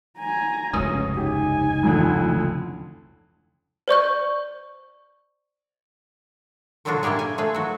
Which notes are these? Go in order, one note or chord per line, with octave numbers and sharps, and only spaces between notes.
G#5 A#5
F1 C#2 G2 C#4 D#6
D#4 G4 G#5
A1 F2 D3
C5 D5 C#6 G6
A#2 D3 F#3 D4 F4 F#4
G3 A#3 E4 G4 G#4
G#5
A3 F4 G#4 B4
F#3 F#4